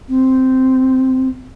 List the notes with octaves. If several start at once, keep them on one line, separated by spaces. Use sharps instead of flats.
C4